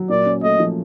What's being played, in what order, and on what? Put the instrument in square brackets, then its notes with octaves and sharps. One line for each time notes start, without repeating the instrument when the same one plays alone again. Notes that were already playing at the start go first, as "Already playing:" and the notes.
Already playing: [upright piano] F#3
[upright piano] A#2 [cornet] D5
[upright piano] C#4
[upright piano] A3 [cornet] D#5
[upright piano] F3